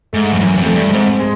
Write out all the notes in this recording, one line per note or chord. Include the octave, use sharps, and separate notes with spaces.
G#2 A3
F2
F#2 E3
F2
A3
G2
G#2 C4
G#3